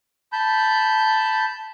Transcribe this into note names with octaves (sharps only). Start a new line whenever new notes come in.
A5 B5 G6